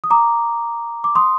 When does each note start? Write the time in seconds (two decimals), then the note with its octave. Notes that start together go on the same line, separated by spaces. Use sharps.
0.04 D#6
0.10 A#5 D6
1.04 D6
1.15 C6 D#6